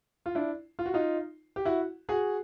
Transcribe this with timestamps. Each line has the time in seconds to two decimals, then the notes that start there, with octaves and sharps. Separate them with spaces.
0.26 F4
0.35 D4 E4
0.79 F4
0.86 F#4
0.94 D#4 F4
1.56 G4
1.65 E4 F#4
2.09 F#4 G#4